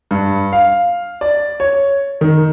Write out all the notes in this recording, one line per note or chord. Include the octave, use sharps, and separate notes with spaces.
G2
F5
D5
C#5
D#3